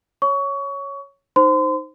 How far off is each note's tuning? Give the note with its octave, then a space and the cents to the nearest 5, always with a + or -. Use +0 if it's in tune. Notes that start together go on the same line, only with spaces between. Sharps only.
C#5 +0 C#6 +25
D#4 +0 C5 +0 C6 -35